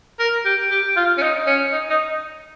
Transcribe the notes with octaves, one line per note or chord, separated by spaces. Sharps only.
A#4
G4
G4
F4
C#4
D#4
C#4
D#4
D#4